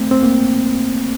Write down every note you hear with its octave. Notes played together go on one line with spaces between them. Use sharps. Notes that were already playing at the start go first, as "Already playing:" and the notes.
Already playing: A3 C4
C4
A#3